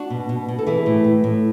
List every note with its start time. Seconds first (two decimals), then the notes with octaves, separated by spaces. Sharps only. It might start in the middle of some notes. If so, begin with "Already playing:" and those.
Already playing: D4 F#4
0.10 B2
0.29 B2
0.48 B2
0.59 A4
0.66 E3 E4 G#4
0.86 A2
1.04 A2
1.24 A2